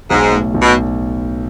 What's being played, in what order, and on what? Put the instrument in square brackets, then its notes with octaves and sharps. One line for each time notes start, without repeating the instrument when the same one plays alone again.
[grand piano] B1 [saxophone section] G#2
[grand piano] A2
B1
[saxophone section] B2